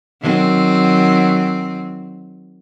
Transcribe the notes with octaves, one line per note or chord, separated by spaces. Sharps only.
D#3 F#3 C4